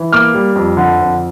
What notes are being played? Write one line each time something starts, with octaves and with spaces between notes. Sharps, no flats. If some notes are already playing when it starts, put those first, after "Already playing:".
Already playing: E3
A#3 D6 F6
G3
F2
D3
F2